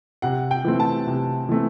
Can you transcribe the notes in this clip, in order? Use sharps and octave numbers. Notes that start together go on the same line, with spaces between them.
C3 F#5
G5
E3 A3 C4
A5
C3
E3 A3 C4